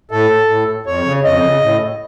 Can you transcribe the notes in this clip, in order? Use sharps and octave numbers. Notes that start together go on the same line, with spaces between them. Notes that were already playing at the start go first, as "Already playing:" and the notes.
A2 A4
A2
F2 C#5
C#3
F2 D#5
C#3
A2